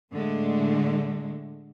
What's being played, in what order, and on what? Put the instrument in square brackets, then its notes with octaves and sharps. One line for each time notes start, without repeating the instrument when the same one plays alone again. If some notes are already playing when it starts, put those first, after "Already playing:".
[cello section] A2 D3 G#3 A3